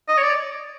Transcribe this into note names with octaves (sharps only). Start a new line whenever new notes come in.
D#5
C#5
D5